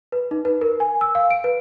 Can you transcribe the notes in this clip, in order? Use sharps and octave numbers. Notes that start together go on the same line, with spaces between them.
B4
D#4
B4
A#4
G#5
E6
F5
D7
B4